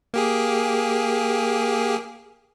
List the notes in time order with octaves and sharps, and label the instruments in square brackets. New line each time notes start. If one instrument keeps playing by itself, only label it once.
[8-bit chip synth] A#3 G4 G#4